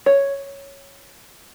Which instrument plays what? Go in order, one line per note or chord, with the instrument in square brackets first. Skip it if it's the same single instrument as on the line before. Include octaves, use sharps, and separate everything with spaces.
[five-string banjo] C#5